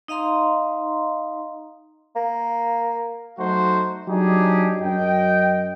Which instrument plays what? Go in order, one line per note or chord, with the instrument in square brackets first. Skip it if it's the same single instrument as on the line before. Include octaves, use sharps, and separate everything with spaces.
[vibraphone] D#4 D#5 F5 A#5 C6
[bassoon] A#3
[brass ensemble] F#3 A3 D#4 F#4 C5
F#3 D4 D#4 G4 G#4
F#2 D#5 G5